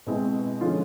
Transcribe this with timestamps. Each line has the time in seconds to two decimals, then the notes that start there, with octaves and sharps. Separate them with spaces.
0.06 B2 G#3 C4 E4
0.61 D3 F3 G#3 C#4 F4